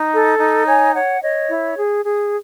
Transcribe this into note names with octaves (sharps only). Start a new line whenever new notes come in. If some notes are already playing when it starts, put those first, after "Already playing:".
Already playing: D#4
A4
D#4
C#5 G#5
C#5 F#5
C#5 D#5
E4
G#4
G#4